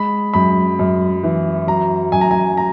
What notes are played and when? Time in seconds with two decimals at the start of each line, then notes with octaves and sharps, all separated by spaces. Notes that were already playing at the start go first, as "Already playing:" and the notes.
Already playing: G#3 B5
0.34 F#2 B5
0.79 F#2
1.23 E3
1.67 F#3 A#5
2.12 F#2 G#5
2.21 A#5
2.31 G#5
2.57 A#5